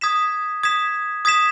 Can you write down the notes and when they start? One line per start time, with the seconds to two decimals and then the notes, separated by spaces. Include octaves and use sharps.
0.01 D#6 G#6 B6 E7
0.63 D#6 G#6 B6 E7
1.25 D#6 G#6 B6 E7